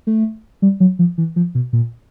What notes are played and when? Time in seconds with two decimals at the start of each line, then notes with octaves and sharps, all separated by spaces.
0.07 A3
0.62 G3
0.80 F#3
0.99 F3
1.18 E3
1.36 F3
1.55 B2
1.73 A#2